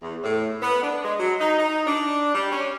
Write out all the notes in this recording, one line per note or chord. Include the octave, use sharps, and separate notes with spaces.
E2
A2
B3
D4
G#3
F#3
D#4
D#4
D4
G3
C#4